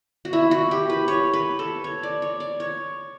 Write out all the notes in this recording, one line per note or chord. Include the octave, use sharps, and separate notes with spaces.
F#4
E4
F#4
G4
B4
C#5
B4
A4
C#5
D5
C#5
D5
C#5